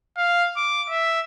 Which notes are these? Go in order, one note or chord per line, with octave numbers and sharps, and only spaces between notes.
F5
D6
E5